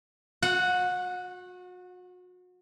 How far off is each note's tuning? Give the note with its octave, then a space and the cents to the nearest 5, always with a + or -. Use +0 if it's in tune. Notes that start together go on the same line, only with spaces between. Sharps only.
F#4 -35 F#5 +0